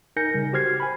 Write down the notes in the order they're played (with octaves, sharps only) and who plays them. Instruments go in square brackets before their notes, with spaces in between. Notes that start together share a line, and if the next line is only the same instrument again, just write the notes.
[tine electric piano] D#4 A#4 G#5 G6 A#6 C#7
C#3 G3
F#4 G4 C5 F6 G#6 C7
G#5 B5